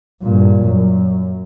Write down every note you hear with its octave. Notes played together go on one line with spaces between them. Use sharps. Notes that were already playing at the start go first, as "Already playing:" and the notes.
G2 A#2
F#2